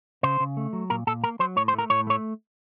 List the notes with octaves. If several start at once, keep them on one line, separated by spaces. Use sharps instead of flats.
C#3 C5
C#3
A3
F#3
A#2 A#4
A#2 A4
A#3 A#4
F#3 C5
A2 C#5
C5
A3
A#4
A2 C#5
A3 C#5